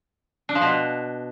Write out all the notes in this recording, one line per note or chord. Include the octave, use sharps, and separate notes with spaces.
D4
F3
B2